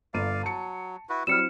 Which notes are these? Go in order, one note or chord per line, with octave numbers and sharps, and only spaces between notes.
G1 D5 F5 D#7
F#3 A5 C#7
E4 F#4 B4
F#3 G3 C4 E4 E6 F6 C#7 E7